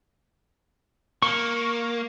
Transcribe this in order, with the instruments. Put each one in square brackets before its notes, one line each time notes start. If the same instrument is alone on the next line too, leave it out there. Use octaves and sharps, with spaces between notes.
[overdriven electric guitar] A#3 [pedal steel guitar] C#6